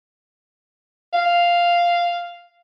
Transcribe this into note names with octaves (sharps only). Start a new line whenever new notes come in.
F5